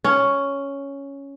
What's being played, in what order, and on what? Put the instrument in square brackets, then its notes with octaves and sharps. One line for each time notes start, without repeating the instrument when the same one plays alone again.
[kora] C#4